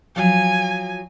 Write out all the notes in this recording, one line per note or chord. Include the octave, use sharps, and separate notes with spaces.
F3 F#3 G#5